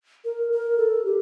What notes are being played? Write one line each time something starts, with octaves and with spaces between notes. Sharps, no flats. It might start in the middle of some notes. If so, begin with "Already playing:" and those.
A#4
A#4
A4
G4